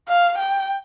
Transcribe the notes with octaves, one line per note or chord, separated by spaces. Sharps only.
F5
G5